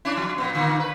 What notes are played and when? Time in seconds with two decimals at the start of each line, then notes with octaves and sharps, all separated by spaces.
0.05 C#4 D4 E4
0.17 F3
0.38 A#2 B3
0.53 A#2 D3 A#3
0.80 B4